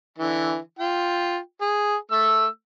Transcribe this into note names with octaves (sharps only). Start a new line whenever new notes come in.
D3 E3
F4 G5
G#4
A3 E6